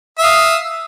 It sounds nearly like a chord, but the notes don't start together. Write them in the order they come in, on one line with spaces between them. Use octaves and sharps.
E5 F5 D#6